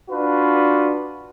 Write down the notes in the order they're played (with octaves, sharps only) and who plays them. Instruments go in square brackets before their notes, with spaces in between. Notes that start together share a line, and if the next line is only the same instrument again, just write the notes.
[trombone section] D4 F4 F#4 B4